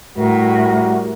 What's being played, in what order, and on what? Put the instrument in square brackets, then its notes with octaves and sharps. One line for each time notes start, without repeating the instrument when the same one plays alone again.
[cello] A2 [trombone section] G3 F#4 A#4